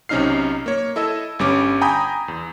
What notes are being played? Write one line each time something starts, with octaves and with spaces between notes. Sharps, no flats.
B1 C3 C#4 D#4 F6 C7
A#3 C#5
E4 A4 D#5 E6
G1 G3 C#4 D6
G5 G#5 A#5 B5 D#6 G6
E2